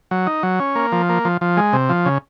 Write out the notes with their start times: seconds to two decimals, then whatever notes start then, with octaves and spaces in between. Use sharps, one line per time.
0.11 F#3
0.27 D#4
0.43 F#3
0.60 C#4
0.75 A#3
0.92 F3
1.09 A#3
1.25 F3
1.41 F3
1.57 G#3
1.73 C3
1.89 F3
2.05 C#3